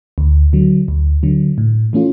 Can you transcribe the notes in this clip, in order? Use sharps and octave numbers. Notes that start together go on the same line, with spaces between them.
D2
D3 F#3
D2
D3 F#3
A2
E3 A3 C#4 F4